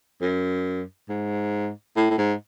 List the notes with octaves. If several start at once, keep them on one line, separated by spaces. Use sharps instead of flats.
F#2
G#2
A2
A2
G#2